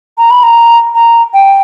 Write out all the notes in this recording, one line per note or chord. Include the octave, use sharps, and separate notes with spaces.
A#5
B5
A#5
A#5
G5